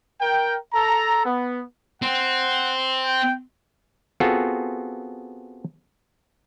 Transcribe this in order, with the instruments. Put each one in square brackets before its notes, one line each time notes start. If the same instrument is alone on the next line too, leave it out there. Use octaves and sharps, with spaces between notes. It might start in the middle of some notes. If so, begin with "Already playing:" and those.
[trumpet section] A#4 G5
A4 A#5
B3
[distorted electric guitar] C4 [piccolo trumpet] F#5
[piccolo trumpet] G5
[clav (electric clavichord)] B3 C4 F4 F#4 G#4 A4